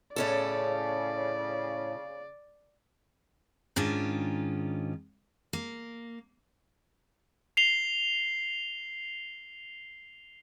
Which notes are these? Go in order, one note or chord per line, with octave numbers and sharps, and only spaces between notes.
A2 C#3 C#4 A4 D5
G#2 D#3 C#4 D4 F4
A#3
C7 F7 G7